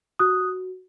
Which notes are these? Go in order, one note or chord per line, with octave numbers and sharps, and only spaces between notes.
F#4 D#6 F#6